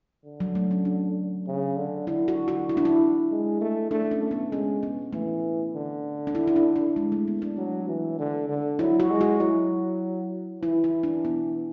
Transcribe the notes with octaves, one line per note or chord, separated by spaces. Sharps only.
D3
F#3
A3
C#4
D4
C#3
D3
D3 E4
F#4
F#4
E4
D4
E4
G#3
A3
A3 D4
C#4
A3
B3
G#3 C#4
B3
E3 A3
D3
D4
E4
E4
D4
D4
G#3
A3
B3
D4
F#3
E3
D3
D3
F#3 E4
F#4
G#3
F#4
F#3 E4
E3 E4
E4
D4
B3